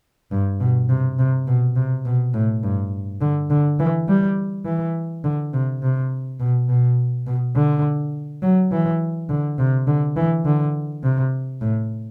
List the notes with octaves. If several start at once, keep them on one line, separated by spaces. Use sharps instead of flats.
G2
B2
C3
C3
B2
C3
B2
A2
G2
D3
D3
E3
G3
E3
D3
C3
C3
B2
B2
B2
D3
F#3
E3
D3
C3
D3
E3
D3
C3
A2